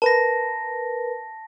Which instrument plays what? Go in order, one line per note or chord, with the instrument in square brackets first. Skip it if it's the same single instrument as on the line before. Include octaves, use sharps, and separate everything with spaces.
[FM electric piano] A#4 B4 [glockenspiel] A5 A#6